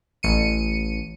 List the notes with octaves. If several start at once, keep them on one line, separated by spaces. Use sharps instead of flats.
A1 C#7 D#7